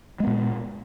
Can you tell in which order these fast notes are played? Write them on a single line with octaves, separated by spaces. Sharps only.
G#3 B3 A#2